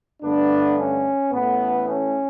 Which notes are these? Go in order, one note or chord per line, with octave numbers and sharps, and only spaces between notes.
G2 D3 A3 B3 D4
C#4
A1 A2 E3 A3 B3
C#4